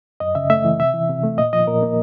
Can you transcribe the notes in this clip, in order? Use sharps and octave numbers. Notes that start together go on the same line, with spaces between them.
F#2 D#5
C#3 E5
A3 E5
E3
C3 E5
E3
C3
A3
A#2 D#5
F3 D#5
A#2 A#4
A#3